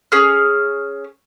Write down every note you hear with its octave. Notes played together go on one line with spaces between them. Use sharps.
C#4 G#4 F6